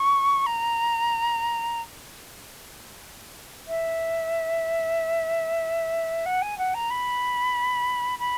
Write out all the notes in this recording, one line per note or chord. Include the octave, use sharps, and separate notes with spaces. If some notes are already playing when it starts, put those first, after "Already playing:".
Already playing: C#6
A#5
E5
F#5
G#5
F#5
A#5
B5
B5